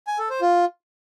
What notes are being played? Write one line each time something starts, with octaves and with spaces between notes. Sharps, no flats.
G#5
A4
C5
F4